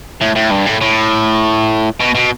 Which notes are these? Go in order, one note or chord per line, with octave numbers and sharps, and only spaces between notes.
A2
A2
G2
A2
A2
B2
B2